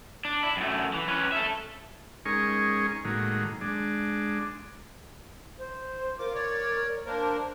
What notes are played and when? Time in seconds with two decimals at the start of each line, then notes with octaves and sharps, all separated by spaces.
0.25 D4
0.43 E4
0.57 F#2 A3
0.94 E3
1.08 C#4 B4
1.32 A4 E5
2.26 G#3 C#4 D#4 G#4 A#4 C#6
3.05 A2 D#3 F#3 G#3 A#3
3.61 G#3 D4
5.59 C5
6.19 F4 A#4 D6
6.34 C#5 D5
7.05 A#3 D4 A#4 C5